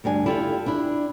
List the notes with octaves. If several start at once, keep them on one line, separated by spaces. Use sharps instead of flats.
D2 G2 D4 G#5
E4 F4 G4 A4
D4 E4